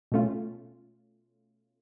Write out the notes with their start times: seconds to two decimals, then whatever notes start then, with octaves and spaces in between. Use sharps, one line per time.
0.12 B2 A3 C#4 F4